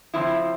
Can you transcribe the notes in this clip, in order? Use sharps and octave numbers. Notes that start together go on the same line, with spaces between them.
C#3 F3 C4 E4